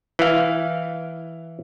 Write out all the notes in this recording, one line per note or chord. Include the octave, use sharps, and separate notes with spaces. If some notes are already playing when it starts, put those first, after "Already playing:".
E3 F5